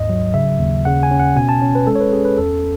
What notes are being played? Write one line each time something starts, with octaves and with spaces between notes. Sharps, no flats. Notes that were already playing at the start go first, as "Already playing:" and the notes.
Already playing: D#2 G#2 D#5
F#3
C#3 E5
D#2
C#3 F#5
G#5
C#4
F#5
B2 G#5
A5
C#4
B4
G#3 A4
C#5
B4
C#4 G#4
B4
E2 A4